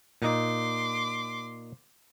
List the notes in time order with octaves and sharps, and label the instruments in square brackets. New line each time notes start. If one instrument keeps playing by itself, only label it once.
[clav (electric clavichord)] A#2 D#4 [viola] C6 D6